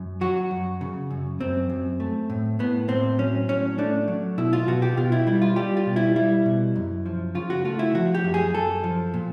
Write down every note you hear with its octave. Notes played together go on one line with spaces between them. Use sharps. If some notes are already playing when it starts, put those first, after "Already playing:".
Already playing: F#2
F#3 F#4
F#2
C#3
F#2
F#2 C4
F#2
A3
A2
A2 B3
A2 C4
F#3 C#4
A2 C#4
A3 D4
F#3
B2 E4
F4
B2 F#4
G4
B2 F4
E4
G3 E4
F4
G3 G4
F4
B2
E4
G3 E4
B2
F#2
F3
C#3 F4
F#4
A3 F4
E4
F3 F#4
G4
F#2
G#4
F#2 A4
F3
A#2